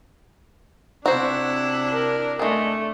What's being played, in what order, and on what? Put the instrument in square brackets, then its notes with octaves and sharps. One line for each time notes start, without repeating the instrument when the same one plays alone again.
[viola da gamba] C3 E4 [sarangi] D4 [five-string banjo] F#4 C5
[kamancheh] A#4
[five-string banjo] G#3 G#4 [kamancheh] A3